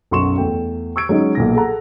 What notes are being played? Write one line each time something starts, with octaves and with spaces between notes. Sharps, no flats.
B1 F#2 F#3 C6 C#6 E7
E2 A3 G5
C#6 E6 G#6 D7
F#3 G#3 C#4 D#4
B1 A#2 A#6
G#4 A4 F#5 A#5